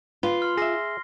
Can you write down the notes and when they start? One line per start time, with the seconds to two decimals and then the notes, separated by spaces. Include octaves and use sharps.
0.23 F4 B4 G7
0.42 C6 F6
0.57 G#4 E5 A#6 C7